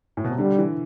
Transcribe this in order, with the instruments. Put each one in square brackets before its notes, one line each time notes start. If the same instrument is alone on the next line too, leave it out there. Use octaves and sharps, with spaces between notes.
[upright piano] A2
B2
C3
[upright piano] D3 [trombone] G3
[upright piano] E3